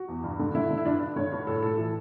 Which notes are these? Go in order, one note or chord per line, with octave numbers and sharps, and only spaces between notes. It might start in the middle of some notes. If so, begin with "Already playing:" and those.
Already playing: F#4
E2
G2
D3
D3 E4
D3
E4
G2 D4
G2
D3 C#5
G2
A2 A4
A2 A4
E3